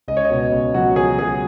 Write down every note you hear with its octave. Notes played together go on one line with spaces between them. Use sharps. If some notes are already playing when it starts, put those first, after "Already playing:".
C#2 D#5
C#5
D#5
B2
C#2
F#3 F#4
F#3 G#4
F#3 G#4